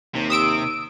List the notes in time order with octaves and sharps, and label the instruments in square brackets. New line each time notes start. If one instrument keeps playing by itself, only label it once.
[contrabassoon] D#2 [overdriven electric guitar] C3
[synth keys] D#6 E6 D7